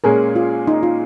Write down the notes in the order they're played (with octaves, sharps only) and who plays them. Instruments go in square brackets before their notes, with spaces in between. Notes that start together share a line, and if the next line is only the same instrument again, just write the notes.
[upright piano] A#2 G#3 C#4 G#4 [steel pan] A#4
[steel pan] F4
D#4
F4